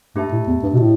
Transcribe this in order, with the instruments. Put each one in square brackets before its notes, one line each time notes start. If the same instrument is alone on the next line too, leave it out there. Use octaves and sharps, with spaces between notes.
[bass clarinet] G2 [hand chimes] A3 G4 E5 A5
[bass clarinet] A2
E2
G2
B2
A2